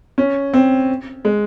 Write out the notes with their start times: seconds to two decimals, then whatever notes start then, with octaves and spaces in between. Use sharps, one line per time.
0.18 C#4
0.53 C4
1.25 G#3